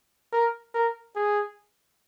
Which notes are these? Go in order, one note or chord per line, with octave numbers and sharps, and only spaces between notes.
A#4
A#4
G#4